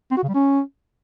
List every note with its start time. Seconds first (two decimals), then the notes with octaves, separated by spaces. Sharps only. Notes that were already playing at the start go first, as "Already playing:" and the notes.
0.11 C4
0.17 F#4
0.23 C#3
0.29 G3
0.34 C#4